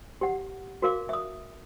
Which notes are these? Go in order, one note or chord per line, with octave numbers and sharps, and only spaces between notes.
G4 F#5
F#4 A#4 F5 D6
E5 D#6